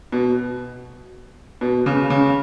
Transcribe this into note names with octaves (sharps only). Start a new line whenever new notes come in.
B2
B2
C#3
C#3